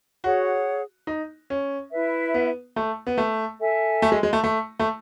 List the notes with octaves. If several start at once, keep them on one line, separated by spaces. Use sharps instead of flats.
F#4 G#4 C#5 F#5
D#4
C#4
E4 B4 E5
B3
A3
B3
A3
A4 E5 G#5
A3
G#3
G#3
A3
A3
A3